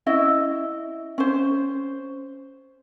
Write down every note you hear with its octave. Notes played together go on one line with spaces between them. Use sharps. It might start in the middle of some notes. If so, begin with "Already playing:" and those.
C#4 E4 D#5 E5
C#4 C5